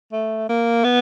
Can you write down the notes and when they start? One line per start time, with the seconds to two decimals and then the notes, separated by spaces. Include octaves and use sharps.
0.13 A3
0.49 A#3
0.84 B3